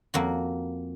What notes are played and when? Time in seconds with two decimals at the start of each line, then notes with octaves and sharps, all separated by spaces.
0.14 F2 A#3 F#4